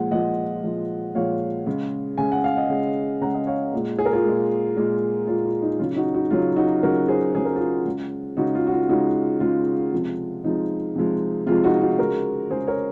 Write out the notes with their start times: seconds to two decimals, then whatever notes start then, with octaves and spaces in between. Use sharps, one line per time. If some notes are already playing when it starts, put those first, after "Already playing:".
Already playing: A#2 F3 G#3 F#5
0.11 A#2 F3 G#3 D#5 F#5
0.63 A#2 F3 G#3
1.15 A#2 F3 G#3 C#5 F5
1.67 C#3 G#3
2.18 C#3 G#3 G#5
2.32 F#5
2.44 F5
2.57 D#5 F#5
2.70 C#3 G#3
3.22 C#3 G#3 F#5 A#5
3.34 D#5 F#5
3.47 C#5 F5
3.74 A#2 G#3
3.99 G#4
4.05 A#4
4.13 F4 G#4
4.24 A#2 G#3
4.77 A#2 G#3
5.27 A#2 G#3 F4
5.45 F4
5.62 D#4
5.79 C#3 F#3 F4
5.96 D#4 F#4
6.14 D#4 F#4
6.30 C#3 F#3 F4
6.56 D#4 F#4
6.83 C#3 F#3 F#4 A#4
7.08 G#4 C5
7.35 C#3 F#3 G#4
7.45 A#4
7.56 F4 G#4
7.86 C#3 G#3
8.37 C#3 G#3 D#4 F#4
8.55 F4
8.67 F#4
8.72 F4
8.89 C#3 G#3 D#4 F#4
9.40 C#3 G#3 F4
9.93 C3 F3 G#3
10.44 C3 F3 G#3 D#4
10.95 C3 F3 G#3
11.47 C3 F3 G#3 F4
11.64 D#4 F#4
11.81 D#4 F#4
11.99 C#3 G#3 F#4 A#4
12.50 C#3 G#4 C5
12.54 G#3
12.67 A#4 C#5